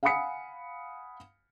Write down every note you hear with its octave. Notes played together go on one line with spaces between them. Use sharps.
F5 F#5 G#5 B5 D#6 C#7